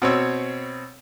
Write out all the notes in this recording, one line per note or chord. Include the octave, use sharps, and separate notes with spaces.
B2 C4 C#5 E6